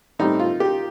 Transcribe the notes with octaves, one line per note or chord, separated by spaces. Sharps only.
A2 G3 C4 D#4 G4
F4
G4